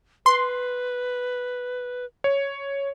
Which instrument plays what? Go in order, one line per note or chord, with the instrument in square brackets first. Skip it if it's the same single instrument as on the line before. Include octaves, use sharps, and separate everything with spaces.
[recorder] B4 [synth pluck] C6
[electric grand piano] C#5